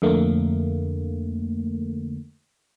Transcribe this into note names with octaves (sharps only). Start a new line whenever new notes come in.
F2 D3 A3 A#3